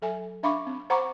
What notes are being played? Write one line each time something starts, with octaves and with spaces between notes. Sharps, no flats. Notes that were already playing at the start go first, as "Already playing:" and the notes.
F#3 A4 E5 G#5
D4 E5 F5 B5 C#6 D6
C4
C5 F#5 A#5 B5 C#6 D6